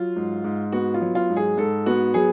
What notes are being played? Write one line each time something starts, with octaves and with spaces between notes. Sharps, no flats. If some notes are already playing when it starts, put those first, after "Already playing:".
Already playing: F#3 F4
G#2
G#2
B3 F#4
F4
F#3
F4
G#2
G#4
G#2 A4
B3 F#4
F#3 G#4